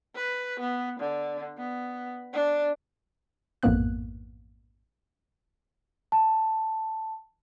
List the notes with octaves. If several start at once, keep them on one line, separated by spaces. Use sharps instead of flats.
B4
B3
D3
B3
D4
A1 F2 G#2 A#3 B3 F#6
A5